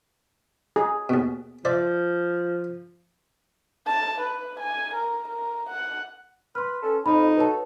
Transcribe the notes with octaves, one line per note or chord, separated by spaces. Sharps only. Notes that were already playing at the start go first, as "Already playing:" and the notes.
G#4
D#2 B2
F3 C5 D5 E5
A5
B4
G#5
A#4
A#4
F#5
B4 C6 F6
C#4 A4
F2 D#4 B5
F#4 A4 B4 C#5 A5